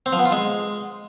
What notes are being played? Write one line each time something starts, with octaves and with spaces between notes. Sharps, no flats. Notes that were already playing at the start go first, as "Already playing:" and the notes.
C4
F3
B3
F4
G#3